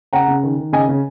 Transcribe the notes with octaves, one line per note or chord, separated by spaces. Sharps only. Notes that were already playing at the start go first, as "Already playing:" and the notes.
C#3 F#5 A#5
C#3
D#3
D#3
C#3 D#5 G#5
C#3